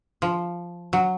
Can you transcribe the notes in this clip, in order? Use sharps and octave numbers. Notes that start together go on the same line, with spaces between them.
F3
F#3